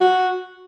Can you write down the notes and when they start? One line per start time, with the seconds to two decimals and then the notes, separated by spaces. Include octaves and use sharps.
0.01 F#4